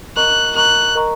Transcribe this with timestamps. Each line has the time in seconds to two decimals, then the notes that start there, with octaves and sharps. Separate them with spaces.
0.16 A#4 D#5 A#5 C#6 F#6
0.55 A#4 D#5 A#5 C#6 F#6
0.95 A#4 D#5 A#5 C#6